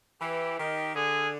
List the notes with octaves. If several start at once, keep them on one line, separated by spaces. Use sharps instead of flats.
E3 G4
D#3 G4
D3 G#4